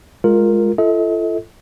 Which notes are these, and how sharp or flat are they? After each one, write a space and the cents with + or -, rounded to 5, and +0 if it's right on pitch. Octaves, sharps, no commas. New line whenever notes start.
G#3 +0 F4 +10 A#4 -5
F4 -40 A4 +0 D#5 +40